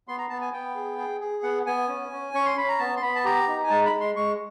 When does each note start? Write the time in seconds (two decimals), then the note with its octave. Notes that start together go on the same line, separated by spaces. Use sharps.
0.08 B3 C6
0.18 A#5
0.30 B3 A5
0.42 G#5
0.53 B3 G5
0.75 G#4
0.98 G#4
1.20 G#4
1.43 B3 F#5
1.66 B3 G#5
1.88 C#4
2.12 C#4
2.34 C#4 C#6
2.45 C6
2.57 C#4 B5
2.68 A#5
2.79 B3 A5
2.97 C6
3.02 B3 B5
3.15 A5
3.25 G4 A#5
3.48 D#4
3.63 G#5
3.70 G#3 A5
3.85 B5
3.92 G#3
4.00 C6
4.16 G#3 C#6